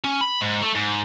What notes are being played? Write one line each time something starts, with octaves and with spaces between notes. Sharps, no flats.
C#4
B5
G#2
A3
G#2